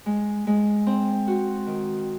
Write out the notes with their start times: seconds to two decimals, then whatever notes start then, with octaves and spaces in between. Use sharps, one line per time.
0.06 G#3
0.47 G#3
0.87 C4
1.27 F#4
1.67 D#3